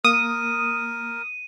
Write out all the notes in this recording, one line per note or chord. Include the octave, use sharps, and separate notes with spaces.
A#3 A#4 D#6 D#7